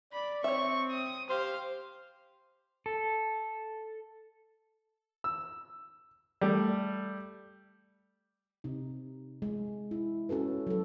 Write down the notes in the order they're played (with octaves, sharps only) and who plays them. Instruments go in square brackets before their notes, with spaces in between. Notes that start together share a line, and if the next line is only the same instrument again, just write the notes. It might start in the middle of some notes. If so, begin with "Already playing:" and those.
[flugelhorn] D5 [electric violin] B5
[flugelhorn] C4 [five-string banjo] C#5 E5 [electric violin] C#6
[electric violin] D#6
[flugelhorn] G4 [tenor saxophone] C5 [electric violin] F5
[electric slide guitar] A4
[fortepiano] E6
G3 A3
[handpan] C3 D#4
G#3
E4
C#4 F#4 A4 B4
F#3 A4